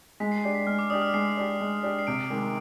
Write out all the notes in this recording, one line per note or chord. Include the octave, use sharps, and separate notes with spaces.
G#3 B6
C7
D4 G4 C7
B6
G#3 F6
D6
D4 G4 D#6
F6
G#3 C7
D4 G4
G#3
D4 G4
C7
C3 D7
D#3 G#3